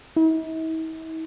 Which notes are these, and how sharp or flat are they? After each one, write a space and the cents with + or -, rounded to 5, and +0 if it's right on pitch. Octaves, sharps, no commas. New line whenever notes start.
E4 -45